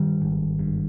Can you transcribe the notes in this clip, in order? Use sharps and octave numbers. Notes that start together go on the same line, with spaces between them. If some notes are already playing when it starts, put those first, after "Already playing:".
Already playing: G2 D#3 G3
G#1
G2